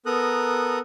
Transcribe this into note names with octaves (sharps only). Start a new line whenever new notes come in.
B3 A4 A#4 A#5 D#6 F#6